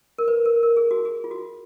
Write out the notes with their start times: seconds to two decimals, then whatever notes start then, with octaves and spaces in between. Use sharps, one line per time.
0.18 A#4
0.28 B4
0.46 A#4
0.63 A#4
0.77 G#4
0.91 F#4
1.05 G#4
1.24 F4
1.31 F#4